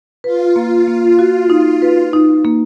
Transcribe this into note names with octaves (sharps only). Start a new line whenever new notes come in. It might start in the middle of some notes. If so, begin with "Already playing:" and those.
F4 B4
A#3
A#3
F#4
D#4
B4
D#4
A#3